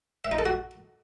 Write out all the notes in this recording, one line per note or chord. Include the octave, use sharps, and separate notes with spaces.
E5
D#4
A4
F#4